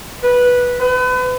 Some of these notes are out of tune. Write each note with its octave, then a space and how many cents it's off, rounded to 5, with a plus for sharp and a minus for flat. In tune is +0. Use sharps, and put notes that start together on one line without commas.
B4 -10
B4 +35